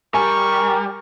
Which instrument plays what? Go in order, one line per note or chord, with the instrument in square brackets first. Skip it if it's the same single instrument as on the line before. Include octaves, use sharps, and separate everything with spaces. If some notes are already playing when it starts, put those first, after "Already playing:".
[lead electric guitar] G3 [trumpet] A#4 [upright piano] G#5 [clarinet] C#6